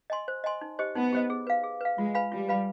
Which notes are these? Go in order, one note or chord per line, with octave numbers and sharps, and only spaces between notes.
D#5 G#5 C6
C5
D#5 G#5 C6
D#4
G4 C5 D#5
B3 D#4
G4 C5 D#5
G#4
B4 F5
G#4
B4 F5
G#3 F4
B4 F5 G#5 B5
G3 F4
B4 F5 G#5 B5